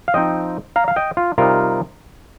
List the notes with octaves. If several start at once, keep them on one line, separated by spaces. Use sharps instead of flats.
F5
F3 C4 D#4 D#5 G5
F5 A#5
F5
D#5 G5
F4
C3 G3 D#4 F4 A#4